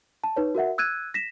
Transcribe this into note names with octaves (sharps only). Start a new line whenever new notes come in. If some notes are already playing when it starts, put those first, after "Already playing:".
A5
D#4 B4 C#5
F#4 A#4 E5 F#5
E6 F#6 G#6 D#7
A#6 B6 E7